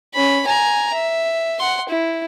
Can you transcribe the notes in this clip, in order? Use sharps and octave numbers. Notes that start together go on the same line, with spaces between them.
C#4 B5
G#5 A#5
E5
F#5 C6
E4